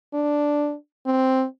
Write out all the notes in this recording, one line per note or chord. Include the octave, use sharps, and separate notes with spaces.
D4
C4